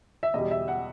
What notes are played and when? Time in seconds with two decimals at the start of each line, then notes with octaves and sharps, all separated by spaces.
0.23 E5
0.34 E2 B2 G3 D#5
0.51 E5
0.68 F#5